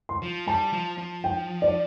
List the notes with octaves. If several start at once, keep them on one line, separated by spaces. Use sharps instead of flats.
C6
F3
G3 A5
F3
F3
G5
D5